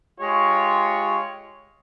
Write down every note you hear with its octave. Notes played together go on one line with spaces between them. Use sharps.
G#3 F4 G4 C#5